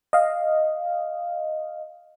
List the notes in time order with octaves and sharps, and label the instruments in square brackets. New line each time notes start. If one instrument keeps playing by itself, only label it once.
[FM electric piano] D#5 F5